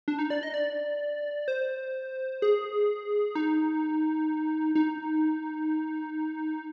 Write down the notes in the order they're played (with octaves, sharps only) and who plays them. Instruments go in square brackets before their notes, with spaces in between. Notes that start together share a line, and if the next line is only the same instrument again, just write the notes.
[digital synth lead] D4
D#4
D5
D#5
D5
C5
G#4
D#4
D#4